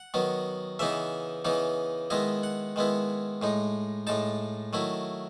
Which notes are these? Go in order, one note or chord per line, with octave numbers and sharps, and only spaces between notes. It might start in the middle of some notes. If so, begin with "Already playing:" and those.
Already playing: F#5
D#3 F#3 B3
C#3 E3 B3 D#4 E5
C#3 E3 B3 D#4
D#3 G#3 B3 E4 D#5
F#5
D#3 G#3 B3 E4
A2 G#3 D#4
A2 G#3 D#4 A5
D#3 F#3 A3 E4